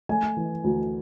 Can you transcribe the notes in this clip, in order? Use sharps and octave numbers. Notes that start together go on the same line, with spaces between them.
A3 G#5
E3
D2